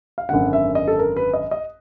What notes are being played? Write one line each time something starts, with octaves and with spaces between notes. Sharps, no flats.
F5
G#1 F#2 D3 F#5
E5
D#5
A4
A#4
B4
D#5
D#5